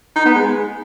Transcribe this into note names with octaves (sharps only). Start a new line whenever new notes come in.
D#4
B3
G#3